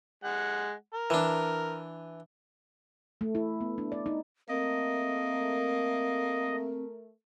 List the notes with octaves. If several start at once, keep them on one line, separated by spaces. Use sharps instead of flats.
G#3 F#5
A#4
E3 D4
A3
E4
B3
D4
D5
D#4
A3 A#3 C4 A#4 D#5